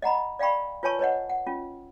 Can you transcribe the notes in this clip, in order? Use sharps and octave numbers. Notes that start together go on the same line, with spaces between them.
D#5 F#5 A#5 B5
D5 F5 G5 B5 C#6
F4 B4 C#5 G#5 A5 C#6
B4 C#5 D#5 F#5
F#5
C#4 F4